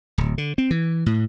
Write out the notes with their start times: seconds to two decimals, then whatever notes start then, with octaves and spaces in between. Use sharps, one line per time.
0.18 D1
0.38 D3
0.58 C4
0.71 E3
1.06 A2